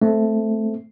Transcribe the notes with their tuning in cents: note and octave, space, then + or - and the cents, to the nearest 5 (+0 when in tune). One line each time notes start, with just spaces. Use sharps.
A3 +0 C4 -5